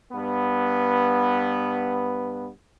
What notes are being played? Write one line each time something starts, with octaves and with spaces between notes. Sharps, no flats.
G2 B3